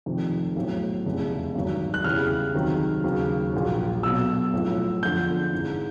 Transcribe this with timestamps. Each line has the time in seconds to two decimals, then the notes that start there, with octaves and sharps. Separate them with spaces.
0.06 F1 F2 C3 D#3
0.56 B1 A2 F#3
1.05 F1 E2 C#3
1.55 G#1 G2 D#3 F#3
1.94 F#6
2.04 E2 C#3 E3 G3 F6
2.55 C#2 C3 D#3 F#3
3.04 D#2 C#3 F#3
3.54 A#1 A#2 F#3
4.03 B1 B2 F#3 E6
4.53 B1 A2 F3
5.03 G1 F2 D3 F3 G6
5.52 G#1 G#2 E3